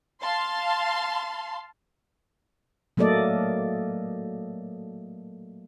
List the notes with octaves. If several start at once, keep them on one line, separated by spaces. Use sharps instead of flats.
F5 A5 C6
F#3 A3 A#3 A4 D5 D#5